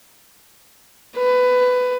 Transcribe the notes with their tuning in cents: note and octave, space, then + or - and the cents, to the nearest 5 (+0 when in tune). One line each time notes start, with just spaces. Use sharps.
B4 +20